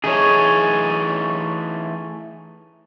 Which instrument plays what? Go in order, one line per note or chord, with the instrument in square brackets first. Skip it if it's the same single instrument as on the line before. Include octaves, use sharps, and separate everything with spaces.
[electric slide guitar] E3 A3 D#4 [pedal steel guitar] G#4 C#5